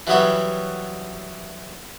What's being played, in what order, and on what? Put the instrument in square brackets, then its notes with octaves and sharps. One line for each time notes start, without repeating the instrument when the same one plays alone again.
[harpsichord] E3 F#3 G3 B3 C#5 E5